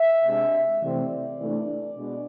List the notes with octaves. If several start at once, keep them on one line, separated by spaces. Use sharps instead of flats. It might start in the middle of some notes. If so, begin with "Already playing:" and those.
Already playing: E5
C3 G#3 D4
C3 E3 A3 C4 D5
C3 E3 A3 D4
B2 G#3 D4